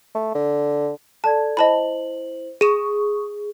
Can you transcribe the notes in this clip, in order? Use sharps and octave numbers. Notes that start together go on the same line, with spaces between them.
A3
D3
A4 D5 A5 G#6
E4 C5 D#5 A5 B5 F#7
G#4 C#6 D#6 D#7 E7